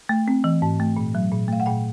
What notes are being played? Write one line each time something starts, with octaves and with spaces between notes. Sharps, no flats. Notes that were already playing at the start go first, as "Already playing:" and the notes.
A3
C4
E3
G#2
A3
A#2
F#3
A#2
A3 F5
F#5
A#2 G5